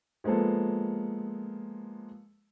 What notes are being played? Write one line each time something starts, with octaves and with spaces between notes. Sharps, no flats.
F3 G#3 A#3 B3 A4